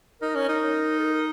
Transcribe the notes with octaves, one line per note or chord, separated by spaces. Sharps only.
D#4 A#4
C#4
D#4
A4
A#4